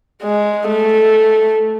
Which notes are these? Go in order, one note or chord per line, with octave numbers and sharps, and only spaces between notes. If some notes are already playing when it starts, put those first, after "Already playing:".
G#3
A3